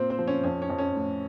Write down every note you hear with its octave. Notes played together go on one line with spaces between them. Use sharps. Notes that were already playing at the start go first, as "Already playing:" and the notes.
Already playing: A#2 C4 C5
C4 C5
F3
C#4
F2 C#4
C#4
F2
C#4
A2